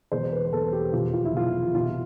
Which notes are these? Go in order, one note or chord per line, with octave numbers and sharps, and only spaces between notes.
E1 E2 B2 C5
B4
B4
E1 E2 B2 A4
G4
F1 E2 B2 F4
F4
E4
F1 E2 B2 F4
C2 B2 F4